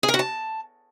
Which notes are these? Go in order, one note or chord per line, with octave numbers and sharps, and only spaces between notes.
G#4
A#4
F#4
A5